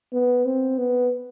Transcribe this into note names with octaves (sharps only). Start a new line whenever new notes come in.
B3
C4
B3